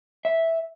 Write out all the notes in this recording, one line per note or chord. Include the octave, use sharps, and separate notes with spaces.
E5